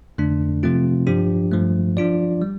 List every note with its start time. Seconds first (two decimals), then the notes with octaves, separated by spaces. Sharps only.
0.18 F2 D3 A3 D4
0.63 C3 F3 A3 C4 F4
1.07 G2 F3 D4 G4
1.52 G2 F3 A3
1.97 F3 D4 F4 D5
2.42 G3